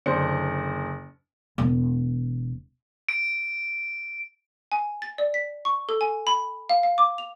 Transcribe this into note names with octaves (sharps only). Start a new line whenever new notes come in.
F#1 D3 C5 C#7
E1
D7
G#5
A6
D5
B6
C#6
A4
G#5
B5
F5
F5
D6
F7